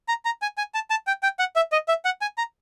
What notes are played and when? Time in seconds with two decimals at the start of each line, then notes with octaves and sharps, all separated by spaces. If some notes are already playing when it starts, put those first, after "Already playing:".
0.08 A#5
0.25 A#5
0.42 G#5
0.58 G#5
0.74 A5
0.90 A5
1.07 G5
1.23 G5
1.39 F#5
1.56 E5
1.72 D#5
1.88 E5
2.05 F#5
2.21 G#5
2.38 A#5